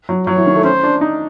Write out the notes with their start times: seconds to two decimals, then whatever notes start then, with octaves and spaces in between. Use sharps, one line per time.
0.09 F#3
0.27 F#3 C#5
0.37 E3
0.46 D#3
0.55 A3
0.64 C#4 C5
0.83 D4
1.01 D#4